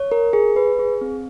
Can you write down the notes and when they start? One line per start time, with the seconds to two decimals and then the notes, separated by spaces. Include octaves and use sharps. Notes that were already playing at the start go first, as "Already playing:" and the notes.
Already playing: C#5
0.12 A#4
0.33 G#4
0.56 B4
0.79 G#4
1.01 C4